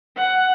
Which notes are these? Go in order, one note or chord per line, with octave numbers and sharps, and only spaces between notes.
F#5